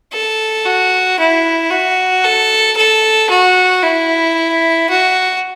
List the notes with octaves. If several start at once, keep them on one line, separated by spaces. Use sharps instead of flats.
A4
F#4
E4
F#4
A4
A4
F#4
E4
F#4